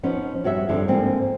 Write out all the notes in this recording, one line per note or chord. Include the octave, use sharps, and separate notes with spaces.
F3 B3 C#4 D#4
G2 F#4 C#5 E5
G2 D3 F3 C4 D4
G#2 D3 F3 A#3 C4